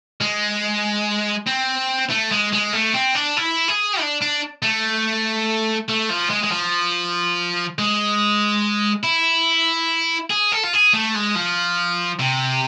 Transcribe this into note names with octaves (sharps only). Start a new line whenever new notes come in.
G#3
C4
A3
G#3
G#3
A3
C4
D4
E4
G#4
D4
D4
A3
A3
F3
G#3
G#3
F3
G#3
E4
G#4
A4
F4
G#4
A3
G#3
F3
C3